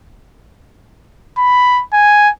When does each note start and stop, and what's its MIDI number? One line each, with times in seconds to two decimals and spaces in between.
1.38 1.83 83
1.93 2.30 80